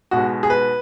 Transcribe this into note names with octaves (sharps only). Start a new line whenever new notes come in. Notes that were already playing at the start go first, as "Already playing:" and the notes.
B1 B2 G#3 F#4
G#4
B4